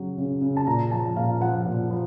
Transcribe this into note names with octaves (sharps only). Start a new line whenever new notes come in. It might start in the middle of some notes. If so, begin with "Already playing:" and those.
Already playing: C#3 F#3
C#3
C#3
A5
A#2 A#5
F3 A5
A#2 F5
F3 F#5
A#2
F3